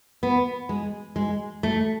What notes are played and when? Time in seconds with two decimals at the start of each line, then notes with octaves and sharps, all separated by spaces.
0.23 B3
0.69 G#3
1.16 G#3
1.63 A3